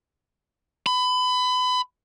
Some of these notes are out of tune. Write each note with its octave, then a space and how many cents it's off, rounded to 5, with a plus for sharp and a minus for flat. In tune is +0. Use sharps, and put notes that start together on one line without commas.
B5 +25